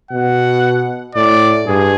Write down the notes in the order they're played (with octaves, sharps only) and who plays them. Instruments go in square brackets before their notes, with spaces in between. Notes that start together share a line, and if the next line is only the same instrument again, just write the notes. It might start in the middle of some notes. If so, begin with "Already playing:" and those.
[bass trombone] B2 [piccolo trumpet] F#5
[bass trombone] A2 [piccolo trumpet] D5
[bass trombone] G2 [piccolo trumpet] G#4